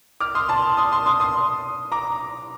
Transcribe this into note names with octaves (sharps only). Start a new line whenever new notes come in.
D6 F6
C6 D#6
A5 C6
C6 D#6
C6 D#6
C6 D#6
C6 D#6
A#5 D6